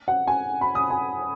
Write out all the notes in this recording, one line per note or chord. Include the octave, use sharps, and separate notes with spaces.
F#5
G#5
B5
D#6
G#5